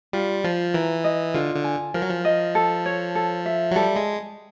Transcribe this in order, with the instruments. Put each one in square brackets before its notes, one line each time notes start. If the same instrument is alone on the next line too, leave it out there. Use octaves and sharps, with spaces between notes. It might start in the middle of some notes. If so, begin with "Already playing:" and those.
[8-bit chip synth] G3 [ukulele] F4
[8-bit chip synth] F3 [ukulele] F4
[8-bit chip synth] E3 [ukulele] A#4
[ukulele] D#5
[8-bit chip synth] D3 [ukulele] F4
[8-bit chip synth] D3
[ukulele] G#5
[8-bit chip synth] F3 [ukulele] A#4
[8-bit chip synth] F#3
F3
[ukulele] D#5
A4
C#5
A4
E5
[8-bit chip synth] F#3
[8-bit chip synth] G3 [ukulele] A4
[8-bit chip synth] G#3